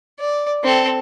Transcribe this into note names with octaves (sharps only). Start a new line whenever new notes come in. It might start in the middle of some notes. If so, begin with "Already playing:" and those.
D5
C4 A4